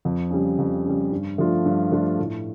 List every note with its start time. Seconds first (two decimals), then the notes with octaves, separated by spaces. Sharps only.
0.05 F2
0.31 C#3 G3
0.58 F2
0.85 C#3 G3
1.12 G2
1.38 F3 A3 D4 F4
1.66 G2
1.92 F3 A3 D4 F4
2.19 A2